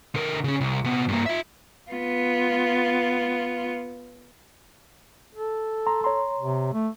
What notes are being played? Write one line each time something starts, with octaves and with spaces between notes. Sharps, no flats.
D3 A#4
C#3 C#4
C2
C3 B3
G2 A#3
F4 E5
B3 F4
A4
A#5 C6
C#5 A#5 C6
C3
A3